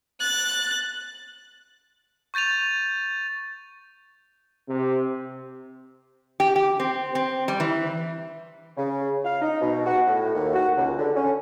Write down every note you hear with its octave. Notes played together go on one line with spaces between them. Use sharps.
F#6 A6
C#6 G6 A6 D#7 F7
C3
G4
G4
C4
C4
G3
E3
C#3
F5
D#4
B2
F#4
A2
D#2
F#4
C#2
D3
C#4